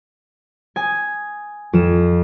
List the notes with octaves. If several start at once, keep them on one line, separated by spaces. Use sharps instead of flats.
G#5 D#6
F2 E7